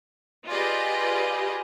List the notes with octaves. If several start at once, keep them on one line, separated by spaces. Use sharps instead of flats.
F4 G4 G#4 B4 D5 D#5